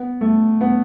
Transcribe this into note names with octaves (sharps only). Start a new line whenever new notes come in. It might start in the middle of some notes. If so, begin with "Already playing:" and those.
Already playing: B3
A3
B3